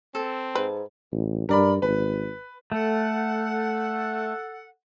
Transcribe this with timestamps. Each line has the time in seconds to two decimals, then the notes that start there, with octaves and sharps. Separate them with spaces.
0.15 C4 A4
0.55 G#2 B4
1.12 A1
1.49 G2 A#4 D5 B5
1.82 G#1 B4
2.72 A3 A4 F#5